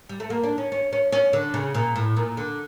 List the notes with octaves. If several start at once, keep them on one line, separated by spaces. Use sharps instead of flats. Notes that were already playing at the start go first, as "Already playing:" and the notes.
G3
A3
A#3
D4
C#4
C#4
C#4
C#4
D3
C#3
A#2
A2
A#2
D3